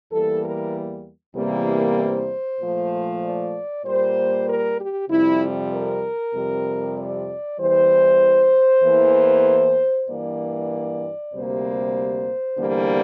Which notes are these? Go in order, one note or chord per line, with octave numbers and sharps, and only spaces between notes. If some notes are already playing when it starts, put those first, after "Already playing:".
E2 E3 G3 A#3 A4
A#4
E2 C3 E3 G3 A#3
C5
A#2 F3 A3
D5
A#2 G3 A#3 C5
A#4
G4
F2 C3 G3 E4
A#4
F2 C3 G3
D5
E2 E3 G3 C5
E2 E3 A#3
G2 E3 A#3 D5
D2 C3 G3 A#3 C5
E2 D3 G3 A#3